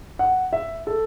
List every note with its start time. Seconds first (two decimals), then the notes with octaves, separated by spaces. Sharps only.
0.19 F#5
0.53 E5
0.87 A4